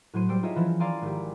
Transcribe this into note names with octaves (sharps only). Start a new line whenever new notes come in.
A2 F#3 C5 C#5 C6 D#7
G3 C5 E6 D7
D#4 F4 G#4 C#5 D#5 E5
E3 F3 C#4
D5 F5 G#5 A#5 C6 E6
G#1 G4